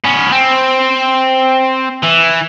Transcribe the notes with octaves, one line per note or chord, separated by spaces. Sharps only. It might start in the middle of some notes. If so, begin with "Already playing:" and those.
B3 C#4
C4
E3